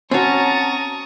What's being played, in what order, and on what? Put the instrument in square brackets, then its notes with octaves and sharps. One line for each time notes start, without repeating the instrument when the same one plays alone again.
[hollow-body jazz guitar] C4 F#4 [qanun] C#4 C#5 [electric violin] A5 A#5 [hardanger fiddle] C#6 D#6